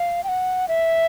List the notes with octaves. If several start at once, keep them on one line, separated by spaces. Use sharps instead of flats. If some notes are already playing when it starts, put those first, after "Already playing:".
Already playing: F5
G5
F#5
E5